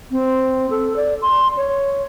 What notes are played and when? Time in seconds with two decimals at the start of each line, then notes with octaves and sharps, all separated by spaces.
0.11 C4
0.70 A4
0.96 D5
1.22 C6
1.57 C#5